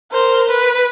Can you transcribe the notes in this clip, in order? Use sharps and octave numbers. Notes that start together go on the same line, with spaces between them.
A#4 C5
B4